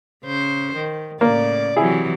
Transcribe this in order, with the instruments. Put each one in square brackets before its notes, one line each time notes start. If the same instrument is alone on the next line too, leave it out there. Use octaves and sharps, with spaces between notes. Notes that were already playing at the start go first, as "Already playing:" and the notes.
[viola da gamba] C#3 C5
D#3
[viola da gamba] A2 C#3 D5 [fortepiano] A#3
[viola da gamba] C3 E3 F#3 [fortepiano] E4 G#4